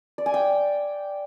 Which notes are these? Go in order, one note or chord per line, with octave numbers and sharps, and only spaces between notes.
D5
G#5
G5